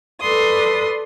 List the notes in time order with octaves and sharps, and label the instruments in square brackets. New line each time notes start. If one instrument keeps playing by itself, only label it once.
[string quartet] A4 B4 D5 C6 D#6